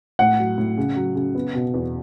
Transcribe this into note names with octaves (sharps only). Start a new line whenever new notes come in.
A2 F#5
F#3
A2
C#3
F#3
C#3
B3
B2
E2